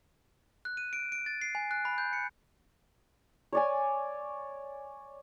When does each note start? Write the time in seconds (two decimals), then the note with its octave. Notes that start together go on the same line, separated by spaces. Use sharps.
0.65 F#6
0.77 D#7
0.93 D7
1.12 D7
1.26 A6
1.41 C7
1.55 G#5
1.71 F#6
1.85 B5
1.98 G6
2.13 C#7
3.53 C#5 D5 G#5